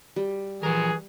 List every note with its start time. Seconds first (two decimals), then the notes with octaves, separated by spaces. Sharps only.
0.16 G3
0.63 E3 F3 G#4 A#4